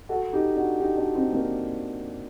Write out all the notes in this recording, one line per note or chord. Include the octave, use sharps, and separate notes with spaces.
F#4 A4
D#4 G4
D4 F#4
D#4 G4
D4 F#4
C4 D#4
A#3 D4